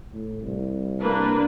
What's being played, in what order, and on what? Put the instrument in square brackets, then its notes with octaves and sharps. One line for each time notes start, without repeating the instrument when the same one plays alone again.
[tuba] A2
C2
[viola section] A#3 D4 B4